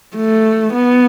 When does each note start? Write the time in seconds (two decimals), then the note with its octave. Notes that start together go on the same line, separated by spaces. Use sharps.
0.16 A3
0.73 B3